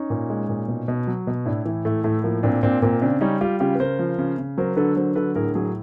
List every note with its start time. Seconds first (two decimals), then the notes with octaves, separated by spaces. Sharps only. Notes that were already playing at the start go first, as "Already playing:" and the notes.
Already playing: C#4 D#4
0.10 A#2
0.30 G#3
0.49 A#2
0.68 B2
0.88 B2
1.07 F#3
1.27 B2
1.46 A2 D4 E4
1.65 E3
1.85 A2 A3
2.04 A2 A3
2.24 F3 A#3
2.43 A#2 C4 D4
2.63 A#2 C4 D4
2.82 A#2 A#3 C4
3.02 C#3 C4 D4
3.21 G3 C#4 D#4
3.41 G3 F4 G4
3.60 C#3 F4 G4
3.75 B4
3.80 C#3 A#4 C5
3.99 F3
4.18 C#3
4.38 C#3
4.58 F#3 A#4 C5
4.76 D3 A4 B4
4.96 F#3 A#4 C5
5.15 D3 A4 B4
5.35 A2 G#4 A#4
5.55 F#3 G#4 A#4